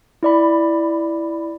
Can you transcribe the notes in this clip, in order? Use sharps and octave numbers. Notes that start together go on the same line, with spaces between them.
E4 D5 B5